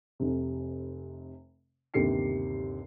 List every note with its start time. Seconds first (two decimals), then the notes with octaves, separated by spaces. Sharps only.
0.20 F1 C3
1.94 G1 D#2 C3 G4 C7 C#7